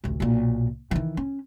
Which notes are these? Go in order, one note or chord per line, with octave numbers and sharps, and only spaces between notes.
A1 D2
B1 A#2
D#3 E3
C#4